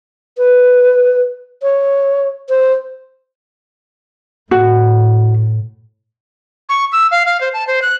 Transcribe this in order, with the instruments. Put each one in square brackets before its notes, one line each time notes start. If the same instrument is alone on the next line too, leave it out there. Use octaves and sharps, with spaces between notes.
[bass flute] B4
C#5
C5
[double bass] A2 [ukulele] F#4
[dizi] C#6
E6
F5
F5
C5
A5
C5
F#6